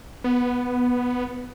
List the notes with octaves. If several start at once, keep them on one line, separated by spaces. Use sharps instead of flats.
B3